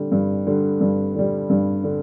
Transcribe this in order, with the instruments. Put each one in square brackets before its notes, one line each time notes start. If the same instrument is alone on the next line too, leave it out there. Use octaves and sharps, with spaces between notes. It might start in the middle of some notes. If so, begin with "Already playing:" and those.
Already playing: [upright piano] D3 G3
G2
D3 G3
G2
D3 G3
G2
D3